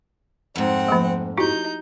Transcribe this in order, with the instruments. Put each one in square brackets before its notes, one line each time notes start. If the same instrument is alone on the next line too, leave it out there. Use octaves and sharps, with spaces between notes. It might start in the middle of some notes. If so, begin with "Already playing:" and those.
[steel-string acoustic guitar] F2 G#2 [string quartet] C4 F#5
[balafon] F3 A3 A#3
[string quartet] D#4 G6 [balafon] E4 F#4 G4